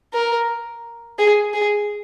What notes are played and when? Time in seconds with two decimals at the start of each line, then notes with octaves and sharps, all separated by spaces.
0.13 A#4
1.18 G#4
1.54 G#4